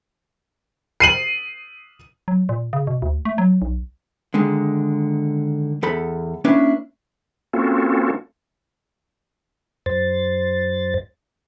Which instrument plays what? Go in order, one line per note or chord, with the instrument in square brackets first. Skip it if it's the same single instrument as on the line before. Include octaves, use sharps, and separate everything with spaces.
[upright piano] C7 D#7 F#7
[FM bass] F#3
A#2
C#3
B2
D2
A3
F#3
B1
[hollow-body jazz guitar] D3 D#3 G#3
E2 A4 B5
A#3 C#4 D4 E4 B4
[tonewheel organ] A#3 C4 C#4 F4 F#4 A4
F#2 C5 A6